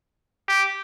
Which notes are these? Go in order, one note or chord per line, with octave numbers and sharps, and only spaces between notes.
G4